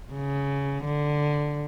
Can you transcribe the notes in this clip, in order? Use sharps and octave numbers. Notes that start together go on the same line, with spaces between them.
C#3
D3